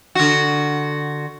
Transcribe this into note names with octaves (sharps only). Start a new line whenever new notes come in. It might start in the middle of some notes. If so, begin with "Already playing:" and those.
D3 F#4